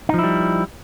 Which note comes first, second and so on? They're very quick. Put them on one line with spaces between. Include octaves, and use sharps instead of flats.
D#4 F3 E4 G3